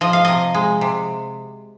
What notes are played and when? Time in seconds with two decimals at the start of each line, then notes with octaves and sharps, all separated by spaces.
0.01 F3 D#5
0.13 F5
0.25 C3 D#5
0.54 G#3
0.81 C3